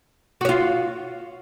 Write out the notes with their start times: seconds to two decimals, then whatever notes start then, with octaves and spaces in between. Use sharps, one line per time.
0.41 F#4
0.45 C#5
0.49 F4